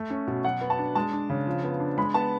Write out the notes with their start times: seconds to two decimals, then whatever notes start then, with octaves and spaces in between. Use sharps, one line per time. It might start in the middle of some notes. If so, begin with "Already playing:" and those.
Already playing: A3
0.10 C#4
0.27 B2
0.45 F#3 F#5
0.61 B3
0.70 A5
0.79 D4
0.95 G#3 A5
1.13 D4
1.30 C#3
1.47 F3
1.64 B3
1.80 D4
1.98 G#3 B5
2.14 B3 A5